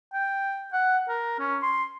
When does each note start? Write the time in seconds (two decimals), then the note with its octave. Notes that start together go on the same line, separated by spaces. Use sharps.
0.13 G5
0.73 F#5
1.09 A#4
1.39 C#4
1.62 C6